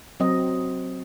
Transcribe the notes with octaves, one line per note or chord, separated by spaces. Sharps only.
F#3 C4 D#5